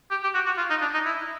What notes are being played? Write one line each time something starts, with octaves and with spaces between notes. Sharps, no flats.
G4
G4
F#4
F#4
F4
D#4
D4
D#4
E4